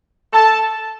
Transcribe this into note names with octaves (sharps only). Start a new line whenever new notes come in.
A4 A5